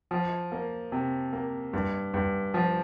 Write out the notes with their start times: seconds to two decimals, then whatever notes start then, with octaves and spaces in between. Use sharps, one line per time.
0.11 F3
0.52 A#3
0.92 C3
1.33 A#3
1.73 G2
2.14 G2
2.54 F3